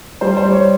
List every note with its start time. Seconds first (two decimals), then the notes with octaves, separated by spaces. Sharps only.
0.21 G3 C5
0.37 C5
0.45 G3
0.53 C#5